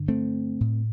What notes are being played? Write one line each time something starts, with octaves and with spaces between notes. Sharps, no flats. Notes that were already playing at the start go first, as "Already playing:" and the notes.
Already playing: G2 D3
A3 C4
A2